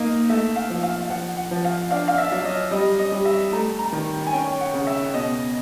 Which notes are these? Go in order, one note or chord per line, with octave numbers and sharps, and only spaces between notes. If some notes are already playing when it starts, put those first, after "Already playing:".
Already playing: A#3 D#4 D#5
A3 E5
F5
F3
F5
F3 F#5
F#5
F3
F5
D4 F5
F5
E5
F#3
D#5
G3 D#5
D#5
G3
E5
A3 A#5
A#5
D#3
G#5
C#4 G5
F#5
C#3
E5
B2 D#5